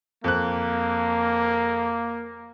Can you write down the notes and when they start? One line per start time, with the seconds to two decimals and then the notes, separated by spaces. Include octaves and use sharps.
0.24 F2 A#3 F#6